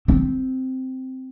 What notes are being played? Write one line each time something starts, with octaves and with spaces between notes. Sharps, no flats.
C4